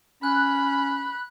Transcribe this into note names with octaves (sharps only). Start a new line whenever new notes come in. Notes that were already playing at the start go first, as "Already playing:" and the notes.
C#4 B5 F#6